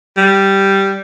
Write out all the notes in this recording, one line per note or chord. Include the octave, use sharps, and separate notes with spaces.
G3